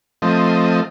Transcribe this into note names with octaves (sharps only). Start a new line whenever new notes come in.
F3 A3 C4 D#5